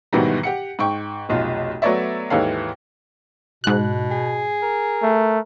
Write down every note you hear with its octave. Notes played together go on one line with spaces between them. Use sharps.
G#2 B2 D#3 E3 F#3 G3
G4 F#5 C#7
G#2 G5 C#6
F1 B1 F4
F#3 A3 B3 C#5 D5 E5
D#2 G#2 E3 A4 C#5 F5
G#2 B2 F#6
G#4
A#4
A3